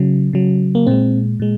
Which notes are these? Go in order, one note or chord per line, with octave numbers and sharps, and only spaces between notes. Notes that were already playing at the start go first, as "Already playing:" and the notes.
Already playing: C#3 F#3
C#3 F#3
A#3
A#2 G#3 C4
A#2 G#3